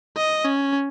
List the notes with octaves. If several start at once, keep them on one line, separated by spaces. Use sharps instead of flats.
D#5
C#4